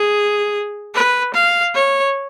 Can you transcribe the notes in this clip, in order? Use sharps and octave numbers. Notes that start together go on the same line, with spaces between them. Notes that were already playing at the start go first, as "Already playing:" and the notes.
Already playing: G#4
B4
F5
C#5